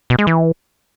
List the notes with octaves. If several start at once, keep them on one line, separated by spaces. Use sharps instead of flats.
B2
G#3
E3